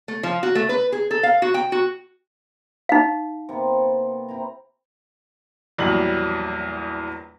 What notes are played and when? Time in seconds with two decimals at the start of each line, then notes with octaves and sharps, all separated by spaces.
0.08 A3
0.23 F3
0.43 F#4
0.55 A3
0.69 B4
0.92 G#4
1.11 A4
1.23 F5
1.42 F#4
1.54 G5
1.72 F#4
2.89 D#4 F5
3.49 C3 A#3 B3
4.29 C4 E4 A#5
5.78 A#1 E2 F#3 G3 F#7